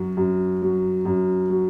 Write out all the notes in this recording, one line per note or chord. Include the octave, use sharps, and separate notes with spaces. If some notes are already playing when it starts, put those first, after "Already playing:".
Already playing: F#2 F#3 F#4
F#2
F#3
F#2
F#3